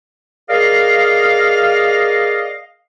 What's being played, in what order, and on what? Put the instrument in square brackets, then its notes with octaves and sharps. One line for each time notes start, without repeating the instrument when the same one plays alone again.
[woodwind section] G#4 A#4 D5 D#5 F5